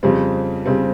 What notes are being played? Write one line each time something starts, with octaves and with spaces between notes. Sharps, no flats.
F2 C#3 G3 C4
C#3 G3 C4